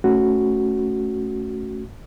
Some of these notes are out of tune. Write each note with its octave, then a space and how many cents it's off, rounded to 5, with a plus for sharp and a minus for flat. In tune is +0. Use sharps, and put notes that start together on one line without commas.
A3 +0 C#4 +0 F#4 +0